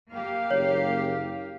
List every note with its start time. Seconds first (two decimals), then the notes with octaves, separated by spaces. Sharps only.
0.12 A#3 G4 F5
0.50 F#1 C#5